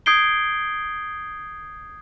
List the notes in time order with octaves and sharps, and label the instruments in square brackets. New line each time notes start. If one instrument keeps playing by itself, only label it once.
[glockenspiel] D#6 G6 G#6 C7 D7 G7